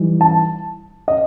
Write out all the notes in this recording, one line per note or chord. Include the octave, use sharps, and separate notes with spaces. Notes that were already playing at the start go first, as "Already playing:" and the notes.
Already playing: E3 G3 D#4
A5
D#5